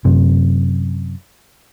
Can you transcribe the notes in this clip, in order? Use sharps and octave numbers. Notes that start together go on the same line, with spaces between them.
F#2 C3